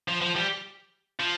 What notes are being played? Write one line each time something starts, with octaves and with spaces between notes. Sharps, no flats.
F3
F3
G3
F3